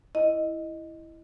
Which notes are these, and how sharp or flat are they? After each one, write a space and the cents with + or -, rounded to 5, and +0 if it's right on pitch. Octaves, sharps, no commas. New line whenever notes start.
E4 +0 D#5 +0